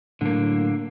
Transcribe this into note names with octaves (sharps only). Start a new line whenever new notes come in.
A2 D3 F#3 A#3